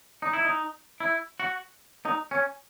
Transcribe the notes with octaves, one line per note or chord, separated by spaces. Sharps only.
D#4
E4
D#4
E4
F#4
D#4
C#4